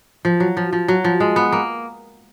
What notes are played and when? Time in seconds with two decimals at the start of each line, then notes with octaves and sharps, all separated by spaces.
0.25 F3
0.40 F#3
0.57 F3
0.73 F3
0.88 F#3
1.04 F3
1.20 G#3
1.36 B3
1.52 A#3